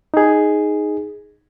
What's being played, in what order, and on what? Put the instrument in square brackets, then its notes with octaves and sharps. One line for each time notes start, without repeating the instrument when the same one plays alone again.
[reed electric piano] D#4 G#4